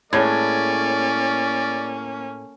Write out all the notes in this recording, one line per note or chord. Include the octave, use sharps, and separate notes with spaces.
A2 G#3 A#3 C#4 C#5 D5 G#6